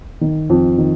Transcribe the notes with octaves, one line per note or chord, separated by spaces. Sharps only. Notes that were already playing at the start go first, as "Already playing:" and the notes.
D#3
F2
D#3